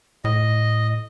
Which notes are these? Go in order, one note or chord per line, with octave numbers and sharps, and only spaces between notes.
A2 D#5